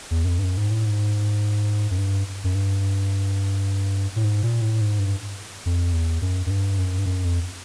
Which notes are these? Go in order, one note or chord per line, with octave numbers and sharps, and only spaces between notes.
E2
F#2
F2
G2
F#2
G#2
A2
G#2
F#2
G2
F#2
G2
A2
G#2
A#2
A2
G#2
G2
F2
E2
F#2
F#2
G2
F#2
G2
F#2
F2